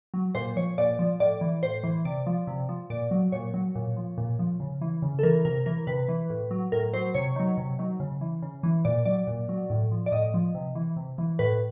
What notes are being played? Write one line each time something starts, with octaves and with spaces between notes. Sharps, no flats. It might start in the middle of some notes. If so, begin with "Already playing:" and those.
F#3
A#2 C5
F3 C#5
A#2 D5
F3
A2 D5
E3
A2 C5
E3
C3 D5
F3
C3
F3
A#2 D5
F#3
A#2 C#5
F#3
A#2
F3
A#2
F3
C#3
E3
C#3
A4
E3 A#4
C3 A#4
E3 A#4
C3 B4
E3
A2
F#3
A2 A#4
F#3 C5
C3 C#5
D#3 F#3
C3
D#3 F#3
C#3
E3
C#3
E3
A#2 D5
F#3 D5
A#2
F#3
A2
F3
D5
A2 D#5
F3
C3
E3
C3
E3
A2 B4